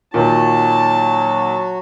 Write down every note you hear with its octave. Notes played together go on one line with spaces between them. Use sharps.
A#2 D#3 F#3 F#4 A5